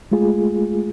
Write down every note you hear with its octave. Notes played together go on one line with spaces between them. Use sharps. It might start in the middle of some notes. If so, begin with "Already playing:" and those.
G#3 A3 F4 G#4